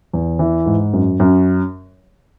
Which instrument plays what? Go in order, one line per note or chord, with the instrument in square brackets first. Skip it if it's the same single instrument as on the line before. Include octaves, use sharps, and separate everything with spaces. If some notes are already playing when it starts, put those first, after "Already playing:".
[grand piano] E2
E3
G#2
F#2
F#2